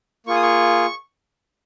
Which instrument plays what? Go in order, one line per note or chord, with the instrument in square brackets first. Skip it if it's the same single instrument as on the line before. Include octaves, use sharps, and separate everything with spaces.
[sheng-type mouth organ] A#3 F4 G#4 C#6
D#6
C#6